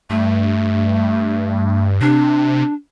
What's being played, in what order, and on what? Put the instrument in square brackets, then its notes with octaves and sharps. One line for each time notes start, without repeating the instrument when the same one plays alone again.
[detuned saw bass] G2 [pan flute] A3
[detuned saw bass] C3 [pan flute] D4